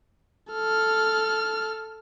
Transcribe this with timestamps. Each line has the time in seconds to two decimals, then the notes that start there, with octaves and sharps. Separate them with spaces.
0.52 A4 F6